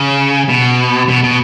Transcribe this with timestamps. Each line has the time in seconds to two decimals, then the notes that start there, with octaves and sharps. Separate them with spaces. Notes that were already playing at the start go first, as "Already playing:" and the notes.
Already playing: C#3
0.49 B2
1.09 B2
1.24 B2